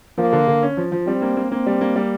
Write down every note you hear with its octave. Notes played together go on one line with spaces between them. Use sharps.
F3 A#3
D3
D3
C#4
F3
F3
G3 C4
A#3
A#3
A#3 C4
G3
A#3
G3